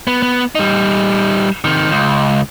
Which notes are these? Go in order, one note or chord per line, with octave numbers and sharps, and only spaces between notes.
B3
B3
G3 D#4
C3 D#3
C#2